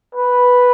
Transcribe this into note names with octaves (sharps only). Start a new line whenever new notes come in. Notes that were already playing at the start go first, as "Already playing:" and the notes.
B4